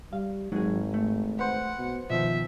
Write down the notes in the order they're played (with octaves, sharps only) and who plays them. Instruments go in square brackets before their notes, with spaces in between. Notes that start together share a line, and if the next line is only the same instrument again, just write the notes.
[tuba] G3 [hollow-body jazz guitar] F5
[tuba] G#1 [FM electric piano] G#2 [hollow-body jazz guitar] F#3 G#4
[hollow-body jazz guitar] A3
[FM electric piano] B4 C5 [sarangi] F#5
[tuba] B2
[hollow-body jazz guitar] B2 D#3 [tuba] F3 [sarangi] E5